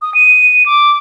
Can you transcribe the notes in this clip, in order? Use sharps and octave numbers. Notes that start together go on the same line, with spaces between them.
D#6
D#7
D6